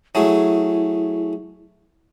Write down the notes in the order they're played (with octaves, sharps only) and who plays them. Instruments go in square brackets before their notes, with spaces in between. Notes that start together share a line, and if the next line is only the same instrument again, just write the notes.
[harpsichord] F#3 A3 G#4 [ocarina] E4